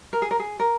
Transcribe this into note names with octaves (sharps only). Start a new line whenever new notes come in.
A#4
G#4
A#4
G#4
A#4